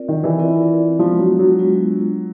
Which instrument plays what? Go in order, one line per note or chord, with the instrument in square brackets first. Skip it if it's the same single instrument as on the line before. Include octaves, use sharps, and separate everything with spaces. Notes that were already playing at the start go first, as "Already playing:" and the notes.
Already playing: [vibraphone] C4 F4 A#4 D5
[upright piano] D#3
E3
[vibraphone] C4 F4 A#4 D5
[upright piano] F3 [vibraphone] G#3 B3 D4 F4
[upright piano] F#3
F#3
[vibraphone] G#3 B3 D4 F4